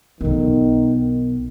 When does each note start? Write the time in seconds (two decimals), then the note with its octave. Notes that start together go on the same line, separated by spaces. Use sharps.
0.21 B1 D#3 B3